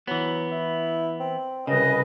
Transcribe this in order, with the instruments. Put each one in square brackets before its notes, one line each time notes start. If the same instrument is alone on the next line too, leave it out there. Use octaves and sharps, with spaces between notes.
[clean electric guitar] E3 B3 [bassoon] F#3
[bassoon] E4
C4
[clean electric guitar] C2 C#3 [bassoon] F#2 [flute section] G#4 B4 D#5